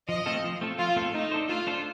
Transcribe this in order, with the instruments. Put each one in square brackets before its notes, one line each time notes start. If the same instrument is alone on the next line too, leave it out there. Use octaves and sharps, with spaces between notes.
[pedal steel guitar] F3 [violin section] D#5
[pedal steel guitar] A3 C4 F4 A4
F3
A3 C4 F4 A4
[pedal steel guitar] F3 [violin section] F4
[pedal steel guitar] A3 C4 F4 A4
[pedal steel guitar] A3 [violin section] D#4
[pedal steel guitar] D4 A4 C5
[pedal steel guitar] A3 [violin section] F4
[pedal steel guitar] D4 A4 C5